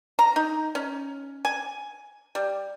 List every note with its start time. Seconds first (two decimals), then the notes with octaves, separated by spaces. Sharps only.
0.19 A#5
0.36 D#4
0.75 C#4
1.45 G#5
2.35 G3